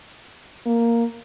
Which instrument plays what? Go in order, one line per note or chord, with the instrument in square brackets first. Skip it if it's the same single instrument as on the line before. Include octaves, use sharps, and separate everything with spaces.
[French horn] A#3